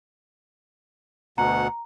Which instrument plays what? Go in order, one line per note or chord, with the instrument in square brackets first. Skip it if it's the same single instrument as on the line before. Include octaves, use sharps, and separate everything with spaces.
[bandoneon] D2 B2 F#5 [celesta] A#5